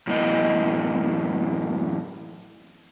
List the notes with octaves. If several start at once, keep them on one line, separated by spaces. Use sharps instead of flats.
F#2 A2 E3 B3 D#5